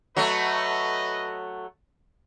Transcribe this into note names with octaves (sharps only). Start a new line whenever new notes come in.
F#3 A3 B4 D#5